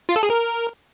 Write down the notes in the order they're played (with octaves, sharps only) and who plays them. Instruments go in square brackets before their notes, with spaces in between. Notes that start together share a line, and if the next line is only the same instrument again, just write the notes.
[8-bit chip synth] F4
A4
G#4
A#4